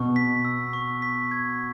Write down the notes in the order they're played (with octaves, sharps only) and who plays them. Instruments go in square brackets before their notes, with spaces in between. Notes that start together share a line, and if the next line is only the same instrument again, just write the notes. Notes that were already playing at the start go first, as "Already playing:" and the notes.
Already playing: [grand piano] B2 [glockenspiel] C#6
[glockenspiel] B6
E6
C#6
B6
G#6